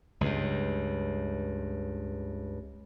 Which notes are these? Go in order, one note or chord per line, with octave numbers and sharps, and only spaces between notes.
C#2 G2